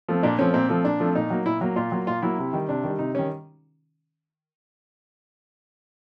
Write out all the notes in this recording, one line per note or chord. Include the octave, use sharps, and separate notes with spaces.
F3 A3 C4
A#2 D4
F3 A3 C4 C#4
A#2 C4
F3 A3 C4
A#2 D4
F3 A3 C4
A#2 D#4
F#3 A#3
A#2 E4
F#3 A#3
A#2 F4
F#3 A#3
A#2 F4
F#3 A#3 E4
C3
D#3 G3
C3 D4
D#3 G3
C3 D#4
D#3 G3 C#4